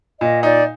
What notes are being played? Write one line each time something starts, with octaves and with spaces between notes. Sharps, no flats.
A#2 D#5
D#4 D5